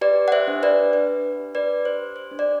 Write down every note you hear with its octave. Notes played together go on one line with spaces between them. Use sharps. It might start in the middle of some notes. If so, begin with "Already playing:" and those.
G4 B4 D5
F#5
C5 E5
D4
B4 D5
D4 B4
G4
B4 D5
G4 C5
C5
D4
D5